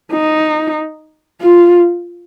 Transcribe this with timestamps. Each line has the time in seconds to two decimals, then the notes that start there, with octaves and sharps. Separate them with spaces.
0.12 D#4
1.42 F4